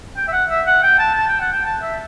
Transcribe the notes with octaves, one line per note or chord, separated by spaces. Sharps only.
G5
E5
F#5
E5
F#5
G5
A5
A5
G5
F#5
G5
A5
E5